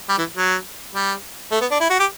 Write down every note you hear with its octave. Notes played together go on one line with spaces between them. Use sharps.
G3
E3
F#3
G3
A3
B3
D4
E4
F#4
G4